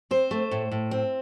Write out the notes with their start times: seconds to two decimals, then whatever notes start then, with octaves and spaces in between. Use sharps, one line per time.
0.11 C4 C5
0.31 A3
0.51 A2
0.71 A2
0.91 C4